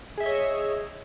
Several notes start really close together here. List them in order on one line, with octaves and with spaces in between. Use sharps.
G#4 E5 D#5 C#5